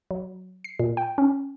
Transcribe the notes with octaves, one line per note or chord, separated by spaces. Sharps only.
F#3
C7
A#2
G5
C#4